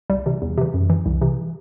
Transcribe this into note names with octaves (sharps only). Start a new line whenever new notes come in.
C2 G3
C3 E3
E2
C3 E3
F#2
E3
C2
C3 E3